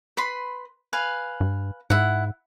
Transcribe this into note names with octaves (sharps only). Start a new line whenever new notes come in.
B4 B5 C6
B4 F5 G#5
G2
G#2 E4 F#5